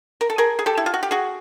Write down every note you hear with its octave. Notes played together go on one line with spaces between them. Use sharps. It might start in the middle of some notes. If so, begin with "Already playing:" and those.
A#4
A4
G#4 A#4
G#4
G4 A4
E4
F4
F#4
G4
F#4 G#4